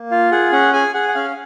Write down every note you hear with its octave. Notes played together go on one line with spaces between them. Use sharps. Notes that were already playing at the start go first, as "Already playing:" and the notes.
Already playing: A#3
F4 F5
G#4 F#5
C#4 F#5
G#4 G#5
G#4 F#5
F#5
C#4 F5